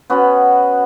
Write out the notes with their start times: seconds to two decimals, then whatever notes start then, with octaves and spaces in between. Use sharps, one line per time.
0.10 B3 C#4 F#4